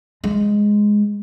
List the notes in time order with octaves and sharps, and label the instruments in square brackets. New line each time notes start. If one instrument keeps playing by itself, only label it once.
[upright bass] G#3